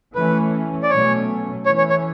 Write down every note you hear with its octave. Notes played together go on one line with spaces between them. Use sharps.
E3 A3 C#4 B4
D5
B2 F#3 A3 C#4 C#5
E3 A3 C#4 C#5
C#5
C#5